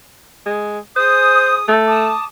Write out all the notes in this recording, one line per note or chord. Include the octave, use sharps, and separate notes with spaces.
G#3
G#4 C5 D#6
A3
A5 D6 D#6